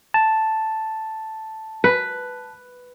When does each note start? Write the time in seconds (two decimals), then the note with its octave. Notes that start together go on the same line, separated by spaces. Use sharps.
0.14 A5
1.84 B4